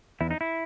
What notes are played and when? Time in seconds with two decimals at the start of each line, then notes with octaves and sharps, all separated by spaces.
0.21 E2 E4
0.31 D#4
0.41 E4